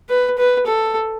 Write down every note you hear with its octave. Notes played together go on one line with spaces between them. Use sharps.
B4
B4
A4